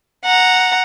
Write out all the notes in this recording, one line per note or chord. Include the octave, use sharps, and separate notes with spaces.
F#5 A#5